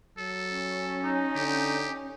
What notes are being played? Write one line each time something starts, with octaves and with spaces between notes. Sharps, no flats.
F#3 A4
C#4
D#4
D3 G4